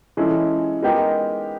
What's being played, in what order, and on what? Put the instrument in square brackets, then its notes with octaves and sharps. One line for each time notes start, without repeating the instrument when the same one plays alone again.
[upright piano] E3 G#3 C#4 E4 A4
G#3 B3 D#4 G4 A#4